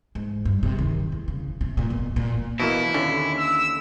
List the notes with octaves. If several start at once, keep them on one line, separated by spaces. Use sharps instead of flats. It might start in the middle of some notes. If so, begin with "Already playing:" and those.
G#2
G2
C3
D#3
E2
C#3
C3
A#2
B2
A#2
B2 E3 A#3 E4
D#2 D3 C#4
E6